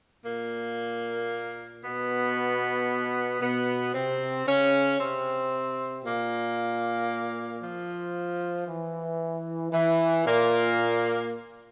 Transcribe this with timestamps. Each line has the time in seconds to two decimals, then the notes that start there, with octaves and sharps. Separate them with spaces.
0.25 A#2 A#3
1.83 B2 B3
3.41 B2 B3
3.94 C3 C4
4.47 C#3 C#4
4.99 C3 C4
6.04 A#2 A#3
7.62 F3
8.68 E3
9.73 E3
10.26 A#2 A#3